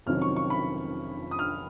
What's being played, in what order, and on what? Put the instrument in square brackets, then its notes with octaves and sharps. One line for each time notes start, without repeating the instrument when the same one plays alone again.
[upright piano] F1 F2 D#3 F#3 C#4 F6
C#6
C#6
B5
D#6
F6